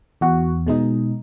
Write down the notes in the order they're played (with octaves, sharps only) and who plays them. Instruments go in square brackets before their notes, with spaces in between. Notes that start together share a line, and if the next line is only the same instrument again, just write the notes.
[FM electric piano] E2 F#4
B2 G#3 D#4